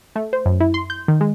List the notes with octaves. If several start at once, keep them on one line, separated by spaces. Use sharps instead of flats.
A3
C5
F#2
E4
C6
G6
D#3
G#3